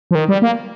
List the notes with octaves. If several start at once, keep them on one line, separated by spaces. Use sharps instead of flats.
F3
D#3
G3
A#3